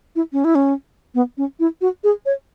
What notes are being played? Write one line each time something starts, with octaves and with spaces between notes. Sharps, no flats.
E4
C#4
E4
C#4
B3
C#4
E4
F#4
G#4
C#5